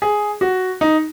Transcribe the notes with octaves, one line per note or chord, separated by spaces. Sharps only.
G#4
F#4
D#4